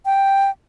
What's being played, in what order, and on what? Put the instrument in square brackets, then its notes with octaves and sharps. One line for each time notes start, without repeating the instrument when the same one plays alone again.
[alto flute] G5